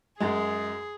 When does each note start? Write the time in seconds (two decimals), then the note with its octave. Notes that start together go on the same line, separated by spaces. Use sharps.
0.20 F#2 G#3 G#4